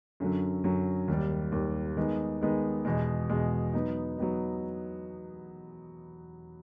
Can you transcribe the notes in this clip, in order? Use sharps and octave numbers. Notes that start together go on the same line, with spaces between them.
F#2 D3 F#3
F#2 D3 F#3
D#2 D#3 G3
D#2 D#3 G3
D#3 G#3 B3 D#4
D#3 G#3 B3 D#4
E2 B2 G#3
E2 B2 G#3
F#3 B3 D#4
F#3 B3 D#4